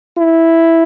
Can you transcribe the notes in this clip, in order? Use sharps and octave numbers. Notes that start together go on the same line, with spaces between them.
E4